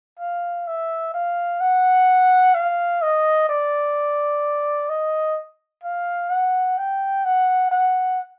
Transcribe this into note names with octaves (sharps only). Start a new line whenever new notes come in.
F5
E5
F5
F#5
F5
D#5
D5
D#5
F5
F#5
G5
F#5
F#5